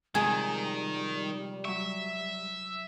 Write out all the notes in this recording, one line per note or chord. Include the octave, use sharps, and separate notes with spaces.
C3 D#3 F3 G3 G#3 G#4
F#3 E5 C#6